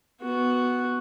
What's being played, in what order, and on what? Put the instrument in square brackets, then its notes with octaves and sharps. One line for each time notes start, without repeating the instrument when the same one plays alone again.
[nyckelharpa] B3 F#4